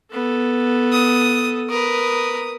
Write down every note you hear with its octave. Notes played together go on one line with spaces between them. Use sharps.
B3 A4
D#6
A#4 B4 D#6